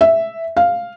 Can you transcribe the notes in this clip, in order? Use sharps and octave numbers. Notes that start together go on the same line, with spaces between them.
E5
F5